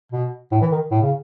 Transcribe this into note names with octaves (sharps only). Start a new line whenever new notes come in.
B2
A2
E3
D#3
A2
C#3